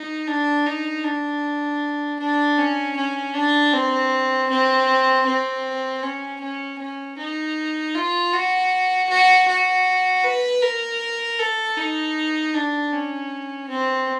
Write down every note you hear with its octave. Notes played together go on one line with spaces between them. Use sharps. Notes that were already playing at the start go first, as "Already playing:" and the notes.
Already playing: D#4
D4
D#4
D4
D4
C#4
C#4
D4
C4
C4
C4
C#4
C#4
C#4
D#4
F4
F#4
F#4
F#4
B4
A#4
A4
D#4
D4
C#4
C4